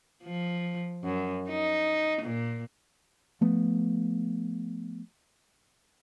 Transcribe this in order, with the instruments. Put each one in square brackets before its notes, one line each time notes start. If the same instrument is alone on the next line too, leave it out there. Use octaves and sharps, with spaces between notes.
[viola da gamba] F3
F#2
D#4
A#2
[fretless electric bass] F3 A3 B3